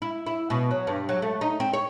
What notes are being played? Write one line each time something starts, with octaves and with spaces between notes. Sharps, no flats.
E4
E4
B2
F#3
G2
F#3
A3
D#4
C4
C#5